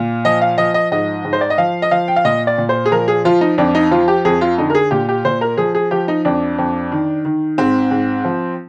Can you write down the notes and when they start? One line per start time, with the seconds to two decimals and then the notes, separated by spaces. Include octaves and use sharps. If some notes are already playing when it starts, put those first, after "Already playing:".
Already playing: A#2
0.25 F3 D#5
0.41 F5
0.58 F3 D#5
0.74 D#5
0.92 G#2 D#5
1.25 G#2
1.33 C5
1.41 D5
1.50 D#5
1.58 F3 F5
1.82 D#5
1.91 F3 F5
2.08 G5
2.16 F5
2.25 A#2 D#5
2.47 D5
2.58 A#2
2.69 C5
2.86 G#4
2.91 F3 A#4
3.08 G#4
3.25 F3 F4
3.41 D#4
3.58 F2 D4
3.75 D#4
3.91 F3 F4
4.08 G4
4.25 F2 G#4
4.41 F4
4.58 D3 D#4
4.70 A#4
4.75 G#4
4.91 A#2 G4
5.09 G4
5.25 A#2 C5
5.41 A#4
5.57 F3 G#4
5.75 G#4
5.91 F3 G4
6.08 D#4
6.25 F2 D4
6.58 F2
6.92 D#3
7.25 D#3
7.58 G#2 C4
7.91 G#2
8.25 F3